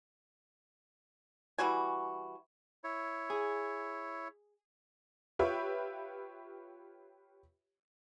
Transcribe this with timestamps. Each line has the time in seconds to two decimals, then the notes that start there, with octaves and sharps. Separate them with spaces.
1.58 E3 G3 F#4 G#5
2.84 E4 C#5
3.30 G#4
5.39 F4 G4 B4 C#5 E5